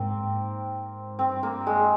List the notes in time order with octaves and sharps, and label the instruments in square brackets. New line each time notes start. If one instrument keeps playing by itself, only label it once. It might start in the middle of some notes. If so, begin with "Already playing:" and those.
Already playing: [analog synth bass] G#2 [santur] A#3 C4
[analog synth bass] G2 [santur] C4
[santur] A#3
G#3